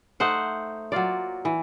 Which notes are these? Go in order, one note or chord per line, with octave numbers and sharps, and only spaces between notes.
A3 D#4 C5 F#5
F#3 A#3 F4 D5
E3